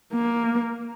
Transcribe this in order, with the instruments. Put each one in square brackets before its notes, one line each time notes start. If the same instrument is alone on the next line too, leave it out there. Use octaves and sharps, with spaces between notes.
[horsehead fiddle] A#3